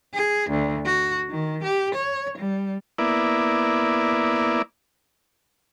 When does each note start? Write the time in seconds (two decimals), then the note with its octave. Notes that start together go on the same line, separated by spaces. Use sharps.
0.13 G#4
0.50 D2
0.85 F#4
1.30 D#3
1.63 G4
1.94 C#5
2.38 G3
2.98 A#3 B3 E4 D5